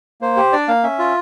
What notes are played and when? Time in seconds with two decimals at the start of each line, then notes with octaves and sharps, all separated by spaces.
0.21 A#3 C5
0.37 G4
0.53 D4 D5
0.68 A#3 F5
0.84 C#4 E5
0.99 F4